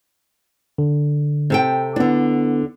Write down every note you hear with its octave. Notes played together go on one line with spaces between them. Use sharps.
D3
C3 A4 G5
D3 B3 D4 E4